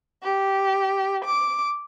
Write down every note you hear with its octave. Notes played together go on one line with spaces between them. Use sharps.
G4
D6